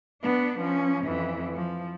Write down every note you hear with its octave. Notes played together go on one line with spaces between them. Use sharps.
B3 D4
F3 C#4
F2 E3
F3